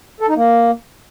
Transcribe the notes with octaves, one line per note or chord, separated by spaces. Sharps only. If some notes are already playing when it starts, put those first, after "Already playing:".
A4
D#4
A#3